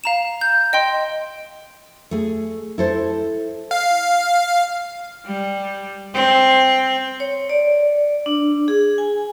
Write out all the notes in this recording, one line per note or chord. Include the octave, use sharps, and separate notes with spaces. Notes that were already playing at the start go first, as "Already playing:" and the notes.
F5 A#5 E7
G6
D#5 G5 C6
A3 G#4
E4 A4 C5
F5
G3
C4
C#5
D5
D4
G#4
G#5